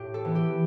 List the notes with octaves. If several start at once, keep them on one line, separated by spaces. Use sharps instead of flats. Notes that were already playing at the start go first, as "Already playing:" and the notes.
Already playing: A2 G4
A4
E3 B3
G4